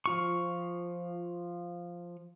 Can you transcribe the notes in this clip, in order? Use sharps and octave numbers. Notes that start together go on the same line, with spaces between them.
F3 F4 C#6